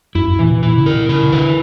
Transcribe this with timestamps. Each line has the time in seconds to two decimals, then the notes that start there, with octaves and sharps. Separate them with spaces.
0.15 F#2 E4
0.27 F#2
0.39 A#2 E3
0.51 B2
0.63 A#2 E4
0.78 C#3
0.86 A#4
0.94 B2
1.09 C#3 E4
1.23 C#3
1.33 D3 B4